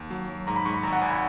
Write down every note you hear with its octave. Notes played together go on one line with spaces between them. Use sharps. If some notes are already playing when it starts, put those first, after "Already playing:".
Already playing: D#2
F#3
F#3
G#2 A#5
B5
G#2 C#6
B5
G#1 A#5
F#5
G#1 G#5
B5